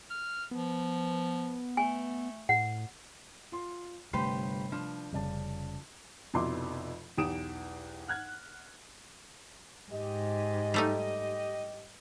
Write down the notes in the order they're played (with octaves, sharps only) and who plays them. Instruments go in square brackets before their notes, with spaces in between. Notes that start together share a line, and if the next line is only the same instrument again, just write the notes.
[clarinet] F6
[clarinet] F3 [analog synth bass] B3
[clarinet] A3 [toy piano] G#5
[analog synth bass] A2 [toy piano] F#5
[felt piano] F4 C6
[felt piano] G1 C7 [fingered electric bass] C3 G3 A3 [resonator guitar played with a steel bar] G4 B4 C5
[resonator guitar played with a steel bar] F3 [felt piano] D4
[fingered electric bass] F1 G3 C#4 [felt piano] C#3 D5 A5
[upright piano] F1 F2 B2 E4 C6 D6
B1 E2 G4 D#6 D7 E7
F#5 F6 F#6 G#6
[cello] G#2 [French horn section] G4 D#5
[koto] G3 A3 D#4